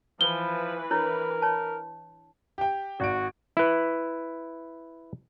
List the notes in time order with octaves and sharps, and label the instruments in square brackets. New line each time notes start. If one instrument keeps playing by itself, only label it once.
[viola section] E3 B4 [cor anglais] F3 [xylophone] G7
[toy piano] D4 E4 C#5 [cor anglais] A#4
[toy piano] C#5 A5
[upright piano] G4 G5
[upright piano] G#1 D7 [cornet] F#4
[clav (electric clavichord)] E4 B4